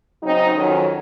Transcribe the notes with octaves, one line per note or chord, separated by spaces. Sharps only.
C#3 F#3 C4 D#4
F2 D#3 F#3 C#4